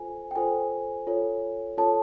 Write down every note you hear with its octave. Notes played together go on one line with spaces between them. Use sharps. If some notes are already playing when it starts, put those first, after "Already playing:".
Already playing: F4 A4 C5 G#5
G5
F4 A4 C5 G#5
F4 A4 C#5
F4 A4 C#5 A5